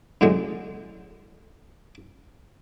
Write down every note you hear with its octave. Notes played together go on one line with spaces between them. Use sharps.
F#2 A2 D3 G#3